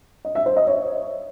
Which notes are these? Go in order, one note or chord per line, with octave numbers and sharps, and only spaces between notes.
D#5
E5
C5
D#5
C#5